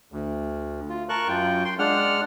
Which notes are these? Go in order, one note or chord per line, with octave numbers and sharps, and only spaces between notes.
D2
F4
A#4 A5 C#6 F#6
F#2 F4 G5
G5 C6
G#3 D4 F#5 F6